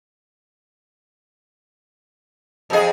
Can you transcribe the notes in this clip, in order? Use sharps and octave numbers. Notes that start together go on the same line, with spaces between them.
F2 G#4 A4 D#5